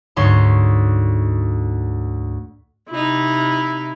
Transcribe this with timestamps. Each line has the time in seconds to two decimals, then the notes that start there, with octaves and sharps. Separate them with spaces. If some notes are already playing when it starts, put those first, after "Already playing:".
0.16 D2 G#2 C#5 C6
2.90 C3 D#4 E4